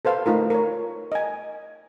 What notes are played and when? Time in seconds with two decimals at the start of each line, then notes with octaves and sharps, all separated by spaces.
0.05 A4 B4 C5 F5
0.26 A3 D#4 F4 A#4
0.50 A#4 C#5
1.12 D#5 G#5